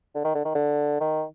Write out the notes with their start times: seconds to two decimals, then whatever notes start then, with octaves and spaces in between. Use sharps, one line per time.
0.15 D3
0.24 D#3
0.35 D3
0.45 D#3
0.55 D3
1.00 D#3